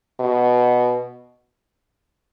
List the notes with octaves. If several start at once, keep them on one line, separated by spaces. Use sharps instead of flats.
B2